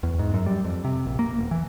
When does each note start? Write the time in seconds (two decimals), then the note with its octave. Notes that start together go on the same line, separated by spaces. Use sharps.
0.03 E2
0.19 G#2
0.34 F#2
0.46 G3
0.64 F2
0.85 C3
1.06 A#1
1.19 A#3
1.39 E1
1.51 E3